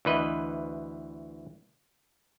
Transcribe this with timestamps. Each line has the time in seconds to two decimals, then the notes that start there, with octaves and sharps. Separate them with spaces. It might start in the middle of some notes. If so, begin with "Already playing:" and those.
0.05 D2 E3 B4 D#5